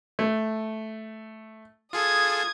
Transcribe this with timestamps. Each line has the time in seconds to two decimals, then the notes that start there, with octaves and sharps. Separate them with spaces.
0.19 A3
1.93 F4 G#4 A4 D#6 G#6